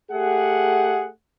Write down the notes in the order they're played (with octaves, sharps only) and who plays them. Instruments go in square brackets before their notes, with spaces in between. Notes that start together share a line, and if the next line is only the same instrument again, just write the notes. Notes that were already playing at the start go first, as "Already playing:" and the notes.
[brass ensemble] A3 G4 G#4 F#5